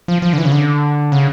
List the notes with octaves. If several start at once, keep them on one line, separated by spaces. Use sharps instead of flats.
F3
F3
D3
E3
C#3
D3
C#3